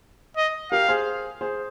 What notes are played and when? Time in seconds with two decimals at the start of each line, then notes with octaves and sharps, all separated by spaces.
0.37 D#5
0.72 G4 A#4 F5
0.88 G#4 C5
1.41 G#4 C5